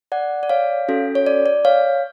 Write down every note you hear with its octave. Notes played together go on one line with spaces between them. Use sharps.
D5 F#5
D5
C#5 F5
C#4 F#4 A4
C#5
D5
D5
C#5 F5